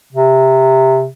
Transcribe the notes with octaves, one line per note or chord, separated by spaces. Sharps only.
C3